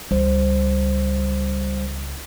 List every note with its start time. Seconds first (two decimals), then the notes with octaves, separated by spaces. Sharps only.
0.11 C#2 G3 C5